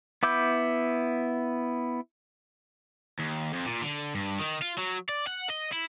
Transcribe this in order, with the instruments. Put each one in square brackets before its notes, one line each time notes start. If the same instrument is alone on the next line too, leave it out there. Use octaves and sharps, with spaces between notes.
[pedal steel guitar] B3 E4 D6 E6 G6
[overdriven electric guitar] D#2
F2
A#2
D3
G2
D#3
F4
F#3
D5
F#5
D#5
E4